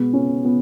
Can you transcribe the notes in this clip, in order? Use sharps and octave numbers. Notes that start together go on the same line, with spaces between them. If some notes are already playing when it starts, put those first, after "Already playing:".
Already playing: B2 G#3 B3
C#4
B3